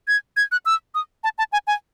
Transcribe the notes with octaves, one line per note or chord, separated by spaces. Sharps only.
G#6
G#6
F#6
E6
D#6
A5
A5
G#5
G#5